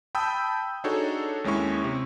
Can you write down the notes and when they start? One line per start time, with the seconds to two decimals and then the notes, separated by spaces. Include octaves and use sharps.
0.15 G5 A5 B5 D#6 E6 G6
0.84 D4 D#4 F#4 G#4 A4 C#5
1.44 D#2 G#3 C#4 E4 C#6
1.84 C3